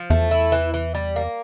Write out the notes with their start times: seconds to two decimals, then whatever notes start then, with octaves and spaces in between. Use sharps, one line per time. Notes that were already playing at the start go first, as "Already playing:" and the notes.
Already playing: F3
0.10 E2 A3
0.31 E4
0.52 E3
0.74 E3
0.95 G3
1.16 A#3